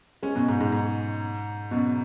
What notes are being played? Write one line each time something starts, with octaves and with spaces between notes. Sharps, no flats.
G#3 C#4
F#2 B2
G#2
G#2
G#2
F#2 B2